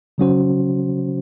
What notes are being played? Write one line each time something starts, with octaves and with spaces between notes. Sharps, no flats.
C#3 F#3 C#4 F#4 C5